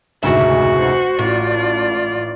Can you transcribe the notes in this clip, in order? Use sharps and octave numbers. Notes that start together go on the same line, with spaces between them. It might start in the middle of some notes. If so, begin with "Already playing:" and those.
F1 D2 G#2 C#3 E4 F#4 E5
C5 F#5
A1 A2 F4 D5